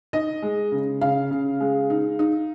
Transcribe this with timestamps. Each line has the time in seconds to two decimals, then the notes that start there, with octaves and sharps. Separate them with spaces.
0.13 D#4 D#5
0.42 G#3
0.72 C#3
1.01 C#3 F5
1.31 C#3
1.60 G#3
1.90 D#4
2.19 D#4